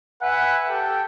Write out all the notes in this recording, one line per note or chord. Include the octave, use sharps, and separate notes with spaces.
B4 E5 F#5 G#5
G4 A4 G5